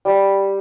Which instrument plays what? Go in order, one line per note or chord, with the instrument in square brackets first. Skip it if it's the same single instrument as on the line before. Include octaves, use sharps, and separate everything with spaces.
[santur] G3